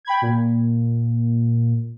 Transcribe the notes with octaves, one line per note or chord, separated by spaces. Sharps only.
G5 B5 G#6
A#2